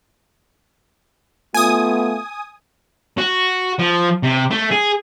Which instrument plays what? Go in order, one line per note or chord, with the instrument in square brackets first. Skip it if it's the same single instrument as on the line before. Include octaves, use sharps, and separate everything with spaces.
[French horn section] A3 B3 F4 [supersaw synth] G#5 D#6
[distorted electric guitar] F#4
F3
C3
A3
G#4